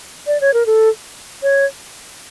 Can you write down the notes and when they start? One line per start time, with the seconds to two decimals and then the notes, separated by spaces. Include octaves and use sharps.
0.27 D5
0.41 C#5
0.54 A#4
0.66 A4
1.43 C#5